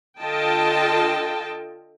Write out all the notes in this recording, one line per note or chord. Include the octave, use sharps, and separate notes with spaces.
D3 F4 A4 D#5 G5 A5